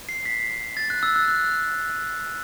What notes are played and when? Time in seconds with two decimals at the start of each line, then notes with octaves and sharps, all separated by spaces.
0.09 C7
0.25 B6
0.77 A6
0.90 F#6
1.03 E6
1.16 F#6
1.28 F#6